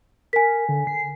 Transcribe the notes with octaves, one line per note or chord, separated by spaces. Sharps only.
A#4 G#5 B6
D3
C7